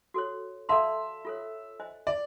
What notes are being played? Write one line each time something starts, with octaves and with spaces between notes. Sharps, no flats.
F#4 A4 C#5
A4 D5 E5 F5 A5 C6
F4 A4 C#5
C5 D#5 G#5
D5